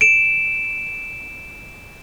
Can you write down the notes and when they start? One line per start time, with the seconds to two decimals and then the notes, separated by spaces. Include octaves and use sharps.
0.01 D7 E7